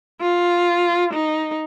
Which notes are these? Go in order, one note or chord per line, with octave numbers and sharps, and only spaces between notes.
F4
D#4